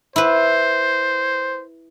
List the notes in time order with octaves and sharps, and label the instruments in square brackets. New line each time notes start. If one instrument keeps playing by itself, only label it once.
[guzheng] E4 B4 [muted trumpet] C5